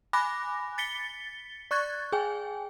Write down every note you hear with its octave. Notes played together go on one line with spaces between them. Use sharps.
G#5 B5 D6 F#6 A#6
A6 B6 C#7 G7
D5 C#6 F#6 G#6 A6
G#4 G5 G#5